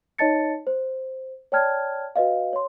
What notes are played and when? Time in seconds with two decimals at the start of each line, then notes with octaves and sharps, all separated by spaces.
0.19 D#4 C#5 D#5 A5 A6 C#7
0.67 C5
1.52 C#5 D5 G5 A5 F6 G#6
2.16 F#4 B4 D#5 F5
2.53 C#5 C6